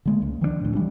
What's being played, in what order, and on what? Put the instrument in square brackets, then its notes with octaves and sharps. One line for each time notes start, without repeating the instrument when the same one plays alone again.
[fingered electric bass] D3 G#3 A#3
C#2
D#3 F3 A#3 D4
D2 A2
E3 F3 G3 D4